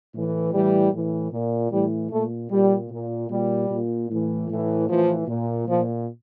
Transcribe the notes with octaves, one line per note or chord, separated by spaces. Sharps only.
A2 E3
A2 E3 G3
A2 E3
A#2
A2 E3 G3
A#2 A3
A#2 G3
A#2
A#2 G3
A#2
A2 E3
A2 E3
A2 E3 F3
A#2
A#2 F3